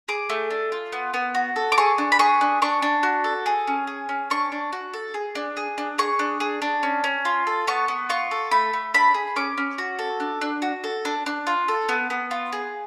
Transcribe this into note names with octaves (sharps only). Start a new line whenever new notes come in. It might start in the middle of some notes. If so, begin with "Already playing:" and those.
G#4 D6
A3
D4
F4
B3
B3
F#4
A4
D6
G#4 C#6
D4
B5
G#4 C#6
D4
D4 C#6
D4
F#4
A4
G#4
C#4
G#4
C#4
D4 C#6
D4
F#4
A4
G#4
D4
G#4
D4
G#4 C#6
D4
G#4
D4
C#4
C#4
F4
A4
B3 C#6
B3
F4 C#6
A4
A3 B5
A3
D4 B5
G#4
C#4 D6
C#4
F#4
A4
D4
D4
F#4
A4
D4
D4
F4
A4
B3
B3
F4
G#4